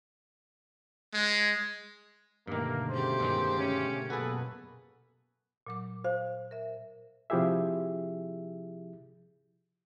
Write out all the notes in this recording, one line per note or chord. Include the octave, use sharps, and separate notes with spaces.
G#3
G2 B2 D3 D#3 A3 A#3
C#3 G4 C5
G2 D#3 G#3
C#4
F#2 B2 A#3 F#4 G#4 A4 B4
A#2 F#3 D6
C5 F5
A#4 E5
C3 F3 E4 G4 G#4 E5